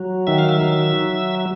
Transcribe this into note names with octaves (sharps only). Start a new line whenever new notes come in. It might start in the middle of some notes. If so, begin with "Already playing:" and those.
Already playing: F#3
D#3 E5
F5
E5
F#3